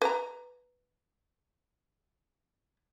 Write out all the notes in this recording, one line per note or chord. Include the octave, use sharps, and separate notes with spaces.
B4 A#5